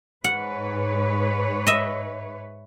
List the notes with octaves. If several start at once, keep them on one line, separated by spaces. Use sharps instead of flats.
G#2 B4 C#5 F#5
D#5 E5